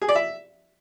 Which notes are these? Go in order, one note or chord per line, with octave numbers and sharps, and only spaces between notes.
G#4
D5
E5